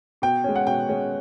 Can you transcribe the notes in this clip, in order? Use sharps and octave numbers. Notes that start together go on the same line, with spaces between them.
B2 G5
G#3 C#4
F#5
B2 G5
G#3 C#4